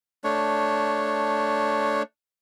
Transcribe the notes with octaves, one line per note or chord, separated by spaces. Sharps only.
A3 D4 C#5